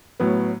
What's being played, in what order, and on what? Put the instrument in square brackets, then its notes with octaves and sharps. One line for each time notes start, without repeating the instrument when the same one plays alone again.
[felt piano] A2 F#3 B3